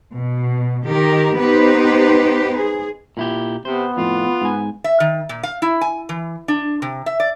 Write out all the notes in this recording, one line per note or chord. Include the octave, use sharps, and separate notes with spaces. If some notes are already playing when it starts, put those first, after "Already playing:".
B2
D#3 G4 A#4
B3 D#4 G4 B4 C5
G#4
A#2 E4 G4
C3 B3 C5
F2 A2 F4
G#2 G#5
E5
D#3
A#2
F5
E4
G#5
E3
D4
C3
E5
D5